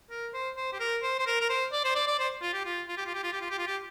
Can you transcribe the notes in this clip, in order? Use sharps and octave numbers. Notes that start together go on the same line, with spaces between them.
A#4
C5
C5
G4
A#4
C5
C5
A#4
A#4
C5
D5
C5
D5
D5
C5
F4
G4
F4
F4
G4
F4
G4
F4
G4
F4
G4
F4
G4